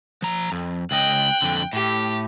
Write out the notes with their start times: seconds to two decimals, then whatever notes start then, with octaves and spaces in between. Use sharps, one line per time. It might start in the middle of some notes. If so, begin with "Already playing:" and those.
0.22 F3 A#5
0.52 F2
0.91 C#2 D#5 G5 F#6
1.42 F2 D3
1.73 A2 G4